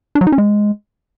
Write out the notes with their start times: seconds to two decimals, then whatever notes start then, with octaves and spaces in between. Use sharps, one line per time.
0.15 D4
0.21 F#3
0.27 D#4
0.32 C#4
0.38 G#3